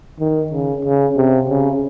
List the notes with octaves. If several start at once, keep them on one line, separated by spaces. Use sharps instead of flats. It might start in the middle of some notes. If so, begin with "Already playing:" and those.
D#3
C#3
C#3
C3
C#3